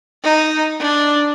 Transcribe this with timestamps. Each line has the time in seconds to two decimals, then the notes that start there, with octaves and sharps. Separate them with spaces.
0.23 D#4
0.80 D4